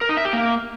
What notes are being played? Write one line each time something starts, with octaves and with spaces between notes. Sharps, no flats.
A#4
D#4
E5
G4
A#3